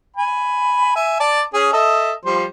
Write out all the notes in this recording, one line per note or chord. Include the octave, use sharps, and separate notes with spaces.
G#5 B5
E5 G#5
D5 A5
C#4 G#4
A4 D#5 E5
F3 G3 C5